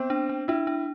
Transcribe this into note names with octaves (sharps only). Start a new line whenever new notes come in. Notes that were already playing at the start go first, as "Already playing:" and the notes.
Already playing: B3 C4
D4
D4
D4 E4
D4